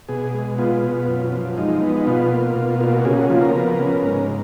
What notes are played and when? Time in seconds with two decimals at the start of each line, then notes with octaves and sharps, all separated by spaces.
0.08 B2 G#4
0.34 G#3
0.58 B3 F4
0.83 B2
1.08 F#2
1.32 F3
1.57 G#3 D#4
1.82 B3
1.96 D#4
2.07 B2 F4
2.32 A#3
2.56 B2
2.80 A#3 F4
2.93 F#4
3.05 C#3 G#4
3.18 F#4
3.30 F3 F4
3.42 A#4
3.55 B3
3.79 C#3
4.04 G#2